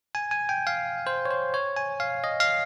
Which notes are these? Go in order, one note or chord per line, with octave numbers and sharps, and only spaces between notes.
G#5
G#5
G5
F5
C5
C#5
C5
C#5
G#5
F5
D#5
F5